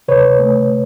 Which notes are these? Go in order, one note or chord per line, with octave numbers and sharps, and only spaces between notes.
C3 B4 C#5
A3